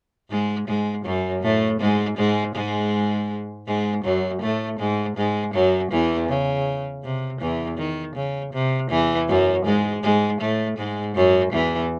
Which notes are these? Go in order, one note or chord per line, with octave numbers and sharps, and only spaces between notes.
G#2 G#3
G#2 G#3
F#2 F#3
A2 A3
G#2 G#3
G#2 G#3
G#2 G#3
G#2 G#3
F#2 F#3
A2 A3
G#2 G#3
G#2 G#3
F#2 F#3
E2 E3
C#3
C3
E2 E3
D#3
C#3
C3
E2 E3
F#2 F#3
G#2 G#3
G#2 G#3
A2 A3
G#2 G#3
F#2 F#3
E2 E3